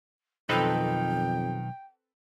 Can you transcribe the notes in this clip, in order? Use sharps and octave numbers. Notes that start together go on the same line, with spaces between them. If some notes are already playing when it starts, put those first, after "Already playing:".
B1 F2 D#3 C4 D#4 A4 B4 G5